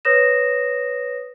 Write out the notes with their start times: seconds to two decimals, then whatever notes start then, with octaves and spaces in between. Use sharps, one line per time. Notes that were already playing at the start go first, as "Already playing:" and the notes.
0.05 B4 C#5 D#6 A#6 E7